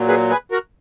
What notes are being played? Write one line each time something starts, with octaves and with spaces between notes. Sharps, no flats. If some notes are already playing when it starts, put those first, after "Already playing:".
Already playing: A#2 F#3
G#4 B4
G#4 B4
F#4 A#4